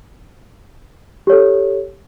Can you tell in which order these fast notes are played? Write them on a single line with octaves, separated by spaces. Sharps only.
G4 C#5 A4